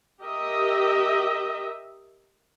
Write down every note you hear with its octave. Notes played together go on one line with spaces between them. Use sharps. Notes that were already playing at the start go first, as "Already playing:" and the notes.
G4 A#4 D#5 E5